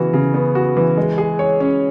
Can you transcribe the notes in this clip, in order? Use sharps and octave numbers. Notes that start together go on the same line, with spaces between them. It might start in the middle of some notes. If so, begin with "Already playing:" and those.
Already playing: C#3 E3 B3 F#4
C#3
B3
F#4
E3
G#3
G#4
C#5
C#4